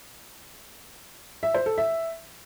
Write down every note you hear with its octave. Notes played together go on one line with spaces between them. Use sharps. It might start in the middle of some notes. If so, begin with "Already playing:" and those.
E5
C5
A4
E5